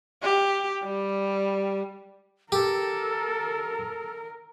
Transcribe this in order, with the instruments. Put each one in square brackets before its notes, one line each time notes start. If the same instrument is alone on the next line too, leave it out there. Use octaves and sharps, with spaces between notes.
[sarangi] G4
G3
[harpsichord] G4 [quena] A4 [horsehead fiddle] A#4